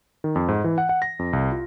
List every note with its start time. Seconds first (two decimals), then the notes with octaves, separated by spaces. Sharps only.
0.24 D#3
0.36 F2
0.49 G#2
0.64 E3
0.78 F#5
0.89 F#5
1.02 A#6
1.19 F2
1.33 C2
1.52 F4